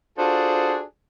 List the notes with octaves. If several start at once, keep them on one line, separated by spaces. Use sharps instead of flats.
D4 F4 F#4 G#4 A4 C5